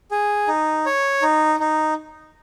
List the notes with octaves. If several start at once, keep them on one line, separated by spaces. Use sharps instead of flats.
G#4
D#4
C#5
D#4
D#4